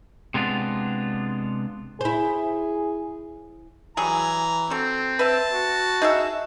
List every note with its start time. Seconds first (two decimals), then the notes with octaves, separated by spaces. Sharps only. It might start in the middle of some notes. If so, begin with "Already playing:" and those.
0.34 C3 G#3 B3 D4 F4
2.01 E4 G#4 C5
3.97 E3 F#3 G3 G#4 A#5
4.70 C4 F#4 A4
5.19 B4 E5 A5
5.52 F#4
6.02 D#4 G#4 E5